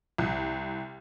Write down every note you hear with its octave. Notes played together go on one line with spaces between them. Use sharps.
C2